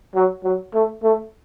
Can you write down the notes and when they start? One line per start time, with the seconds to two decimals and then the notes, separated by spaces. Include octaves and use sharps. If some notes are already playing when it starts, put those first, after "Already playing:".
0.15 F#3
0.44 F#3
0.74 A3
1.03 A3